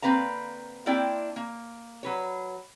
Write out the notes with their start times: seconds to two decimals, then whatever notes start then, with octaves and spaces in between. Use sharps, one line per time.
0.02 D3 A#3 C4 B4 F5 A#5
0.86 A#3 C4 D4 E4 D5 G5
1.36 A#3
2.03 F#3 B4 C#5